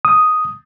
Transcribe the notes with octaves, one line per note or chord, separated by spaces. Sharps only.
D#6